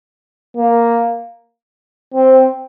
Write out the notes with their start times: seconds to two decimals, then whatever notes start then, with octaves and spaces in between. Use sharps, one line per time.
0.57 A#3
2.14 C4